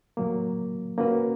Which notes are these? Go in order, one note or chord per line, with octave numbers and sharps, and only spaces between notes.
A2 F#3 A#3
A#3 C#4 F#4 B4